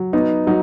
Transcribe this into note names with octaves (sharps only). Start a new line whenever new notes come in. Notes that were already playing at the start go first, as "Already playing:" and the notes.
Already playing: F#3
B3 D#4
F#3 D#4